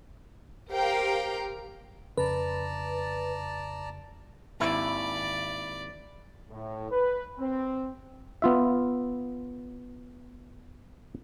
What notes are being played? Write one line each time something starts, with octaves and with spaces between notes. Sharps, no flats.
G4 A#4 C5 F5 G5
F2 C#3 B4 D5 A5 A#5
G#1 D#2 E4 D5 B5
A2
B4
C4
B3 F4 E5